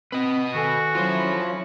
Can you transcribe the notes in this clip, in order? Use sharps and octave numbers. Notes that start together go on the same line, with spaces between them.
C4 B4 D#5
D#3 F#4 A4 G#5
F#3 C#4 E4 F4 C5